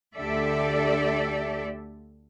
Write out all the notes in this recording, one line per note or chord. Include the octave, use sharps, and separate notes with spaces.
D2 D3 G4 A4 D5 E5